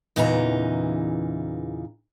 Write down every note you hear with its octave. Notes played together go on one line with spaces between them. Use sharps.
E2 A#2 C#3 E3 D#4 A#5